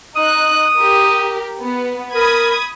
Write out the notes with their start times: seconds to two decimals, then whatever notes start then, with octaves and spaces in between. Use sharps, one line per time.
0.16 D#4 D#6 F#6
0.77 G4 A#4
1.61 B3
2.15 A#4 B5 D#6 G#6